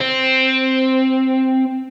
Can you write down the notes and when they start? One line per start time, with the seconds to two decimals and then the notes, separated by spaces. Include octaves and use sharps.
0.01 C4